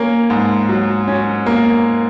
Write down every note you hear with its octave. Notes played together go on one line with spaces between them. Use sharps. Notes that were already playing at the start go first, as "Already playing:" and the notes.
Already playing: A#3 C#4
G#2
F#3
C#4
A#3